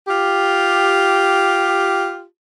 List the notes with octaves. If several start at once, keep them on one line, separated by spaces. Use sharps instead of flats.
F4 G4